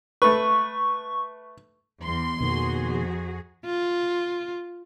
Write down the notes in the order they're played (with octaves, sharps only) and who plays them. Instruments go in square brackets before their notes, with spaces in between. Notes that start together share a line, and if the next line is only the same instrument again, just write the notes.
[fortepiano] A3 B4 [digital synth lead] C#6
[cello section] E2 [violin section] C6
[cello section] F2 F#4 G#4 [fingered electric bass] B2 D#3 A#3
[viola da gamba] F4